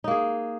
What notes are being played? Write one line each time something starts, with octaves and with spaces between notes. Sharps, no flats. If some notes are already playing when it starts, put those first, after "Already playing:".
A#3 D#4 G#4